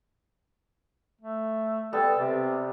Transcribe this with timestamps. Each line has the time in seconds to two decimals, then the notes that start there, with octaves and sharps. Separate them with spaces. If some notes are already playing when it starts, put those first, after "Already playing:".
1.21 A3
1.93 G3 B3 A4
2.18 C3